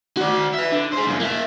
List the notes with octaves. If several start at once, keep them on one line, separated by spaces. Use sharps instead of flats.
F#4 D5
B4 E5
D3
G#4 C5
F#2 A#2
A#3 E5